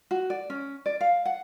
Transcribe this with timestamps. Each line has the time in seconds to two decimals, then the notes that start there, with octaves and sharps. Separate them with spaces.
0.11 F#4
0.30 D5
0.50 C#4
0.86 D5
1.01 F5
1.26 F#5